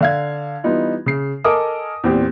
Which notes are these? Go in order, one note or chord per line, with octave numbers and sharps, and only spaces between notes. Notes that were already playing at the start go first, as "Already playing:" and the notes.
D3 F5 G#6
E3 G3 B3 D#4 F4
C#3 C7
A4 A#4 D#5 G#5 D6 D#6
E2 A#2 C4 G4